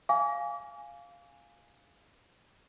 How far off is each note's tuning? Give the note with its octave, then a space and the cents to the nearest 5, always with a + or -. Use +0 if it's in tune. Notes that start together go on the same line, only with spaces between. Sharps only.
F5 +0 G#5 +0 D6 -40